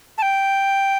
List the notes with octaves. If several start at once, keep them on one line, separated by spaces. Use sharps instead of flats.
A5
G5